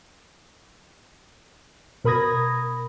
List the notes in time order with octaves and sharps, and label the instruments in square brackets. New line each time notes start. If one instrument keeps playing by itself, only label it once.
[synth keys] B2 A#4 B5 D#6 G#6 A#6